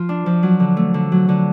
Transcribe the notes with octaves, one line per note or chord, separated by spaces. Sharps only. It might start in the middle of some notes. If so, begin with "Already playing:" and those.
Already playing: F3 F4
D4
F3
F#3
D3
A3
D3
F#3
D3